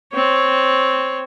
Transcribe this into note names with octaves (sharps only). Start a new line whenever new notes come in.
C4 C#5